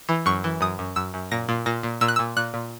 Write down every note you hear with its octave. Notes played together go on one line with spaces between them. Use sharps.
E3
F#2 C#6
E3
F#2 D#6
F#2
F#2 E6
F#2
A#2 A#6
A#2
A#2 A#6
A#2
A#2 E6
F#6
E6
A#2
A#2 F#6
A#2